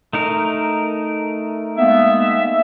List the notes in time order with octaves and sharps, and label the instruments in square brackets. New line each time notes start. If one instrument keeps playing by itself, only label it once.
[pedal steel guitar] A3 D#4 A#4
[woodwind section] G#3 A#3 B3 [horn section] E5